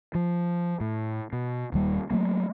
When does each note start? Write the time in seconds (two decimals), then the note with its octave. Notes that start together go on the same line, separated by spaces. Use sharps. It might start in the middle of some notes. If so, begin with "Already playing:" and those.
0.15 F3
0.80 A2
1.33 B2
1.72 D#1 D#2 G3
2.10 F#3 A3 A#3